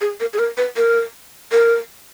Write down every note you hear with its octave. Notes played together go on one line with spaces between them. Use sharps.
G#4
A#4
G#4
A#4
B4
A#4
A#4